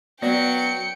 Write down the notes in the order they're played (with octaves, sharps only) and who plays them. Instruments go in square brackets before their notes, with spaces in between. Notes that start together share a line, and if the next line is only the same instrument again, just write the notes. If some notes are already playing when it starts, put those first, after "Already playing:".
[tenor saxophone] F#3 [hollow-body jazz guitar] B3 [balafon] D5 [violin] G5 C#7